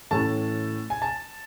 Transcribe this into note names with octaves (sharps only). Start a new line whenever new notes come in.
A2 E3 A3 C#4 A5
G#5
A5